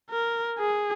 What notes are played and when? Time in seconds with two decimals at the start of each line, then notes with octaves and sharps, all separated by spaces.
0.10 A#4
0.59 G#4